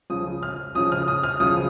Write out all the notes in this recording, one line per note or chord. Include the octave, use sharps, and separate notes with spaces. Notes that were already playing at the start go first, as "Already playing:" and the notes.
C#2 C#3 F3 D#6
F6
C#2 C#3 F3 D#6
F6
D#6
F6
C#2 C#3 F3 D#6